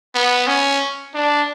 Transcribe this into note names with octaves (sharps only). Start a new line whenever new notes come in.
B3
C#4
D4